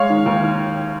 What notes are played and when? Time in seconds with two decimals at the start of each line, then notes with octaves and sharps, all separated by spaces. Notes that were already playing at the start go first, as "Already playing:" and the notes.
Already playing: G#3 C#5 F5
0.09 D#3
0.26 D#2